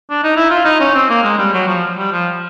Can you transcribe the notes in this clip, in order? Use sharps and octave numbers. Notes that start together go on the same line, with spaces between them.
D4
D#4
E4
F4
D#4
C#4
C4
A#3
G#3
G3
F#3
F3
G3
F3